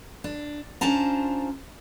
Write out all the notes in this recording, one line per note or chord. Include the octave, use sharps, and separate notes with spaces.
D4
C#4 D4 F4 C5 A5 A#5